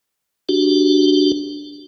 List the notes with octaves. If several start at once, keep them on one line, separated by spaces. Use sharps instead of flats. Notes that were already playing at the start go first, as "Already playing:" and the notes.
D4 F#4 G4